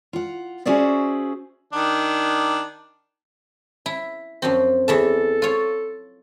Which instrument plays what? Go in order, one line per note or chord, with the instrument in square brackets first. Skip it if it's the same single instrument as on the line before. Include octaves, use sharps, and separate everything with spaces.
[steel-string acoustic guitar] F4 F#5
C#4 F#4 G#4 C5 D5 E5
[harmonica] D#3 D4
[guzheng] E4
F#2 F3 C4
[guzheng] E2 E3 A5 [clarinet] A4
[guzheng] F4 C#5